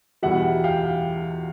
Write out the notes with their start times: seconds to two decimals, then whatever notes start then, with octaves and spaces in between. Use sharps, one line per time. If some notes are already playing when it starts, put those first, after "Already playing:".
0.23 E2 B2 G3 E5 F#5
0.64 F5 G5